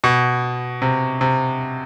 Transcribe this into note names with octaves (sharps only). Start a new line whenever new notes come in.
B2
C3
C3